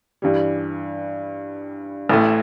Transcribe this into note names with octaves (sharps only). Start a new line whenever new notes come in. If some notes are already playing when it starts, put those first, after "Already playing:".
G2 E3 G3
A1 A2 A3